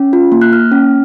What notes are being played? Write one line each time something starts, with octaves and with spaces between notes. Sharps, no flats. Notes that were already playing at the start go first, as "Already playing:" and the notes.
Already playing: C#4
F4
A#3
F#6
A#3 F6
C#4